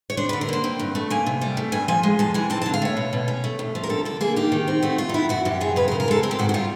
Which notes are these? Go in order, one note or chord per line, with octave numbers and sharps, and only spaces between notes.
C#5
D4 C5
B4
D3
A#4
A#3 C5
C4
G2
A3
A#3 G#5
C3
G3
A3
G2 G#5
F3 G#5
G#3
F2 A5
E3 G#5
C4 A5
A5
D3
F5
A3 C#5
B2
B2
C#4
A3
F2
F3
A#4
D3 A4
D3 A4
A#3 G#4
D#4 G4
D#3
C4
A3 F#4
F2 F4
D#4
F#3 E4
F#2 F#4
F#2 G4
F3 G#4
C#3 B4
A#4
C#3
A#4
G#3 A4
C4 A#4
G4
G#2 F#4
F#4
G3 F4